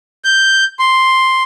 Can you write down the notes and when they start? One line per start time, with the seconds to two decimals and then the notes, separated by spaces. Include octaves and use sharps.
0.25 G6
0.79 C6